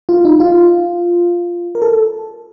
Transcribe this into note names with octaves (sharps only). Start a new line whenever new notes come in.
F4
D#4
F4
A#4
A4